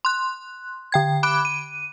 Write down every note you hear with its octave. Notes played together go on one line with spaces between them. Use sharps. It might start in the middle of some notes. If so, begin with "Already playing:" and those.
C6 F#6
D3 G5 G#6
B5 D6 F#6 D7
D#7